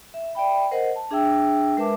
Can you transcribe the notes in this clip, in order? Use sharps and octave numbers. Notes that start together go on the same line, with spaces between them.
E5
D5 E5 G5 B5
A#4 C5 D#5 F#5
A5
D4 G#4 E5 G5 E6
G#3 A#4 B4 E5 A5 D6